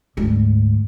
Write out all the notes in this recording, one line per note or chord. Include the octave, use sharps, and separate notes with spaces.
D2 G#2